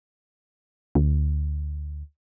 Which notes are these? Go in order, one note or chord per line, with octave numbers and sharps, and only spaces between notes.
D2